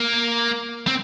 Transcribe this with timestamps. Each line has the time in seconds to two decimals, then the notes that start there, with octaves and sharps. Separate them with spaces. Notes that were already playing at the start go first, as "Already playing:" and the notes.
Already playing: A#3
0.88 C4